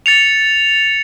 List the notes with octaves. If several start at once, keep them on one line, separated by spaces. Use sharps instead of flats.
A6 C#7 F7